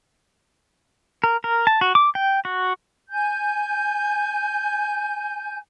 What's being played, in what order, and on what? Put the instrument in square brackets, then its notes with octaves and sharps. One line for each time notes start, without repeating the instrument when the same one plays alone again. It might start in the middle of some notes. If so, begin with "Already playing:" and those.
[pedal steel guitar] A#4
A#4
A5
F#4
D6
G5
F#4
[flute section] G#5 G6